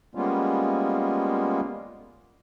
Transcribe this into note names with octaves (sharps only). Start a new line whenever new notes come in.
G3 G#3 A#3 B3 C#4 F4